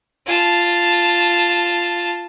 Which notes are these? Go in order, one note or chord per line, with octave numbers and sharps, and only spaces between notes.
F4 A5